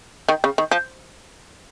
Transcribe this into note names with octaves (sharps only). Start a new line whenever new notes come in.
D#3
C#3
D#3
F3